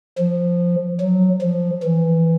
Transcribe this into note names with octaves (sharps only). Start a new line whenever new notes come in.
F3
F#3
F3
E3